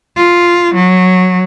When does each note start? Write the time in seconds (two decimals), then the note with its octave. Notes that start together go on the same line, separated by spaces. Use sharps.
0.17 F4
0.75 F#3